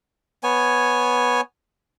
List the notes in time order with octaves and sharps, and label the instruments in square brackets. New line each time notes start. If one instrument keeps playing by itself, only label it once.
[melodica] B3 C#5 G#5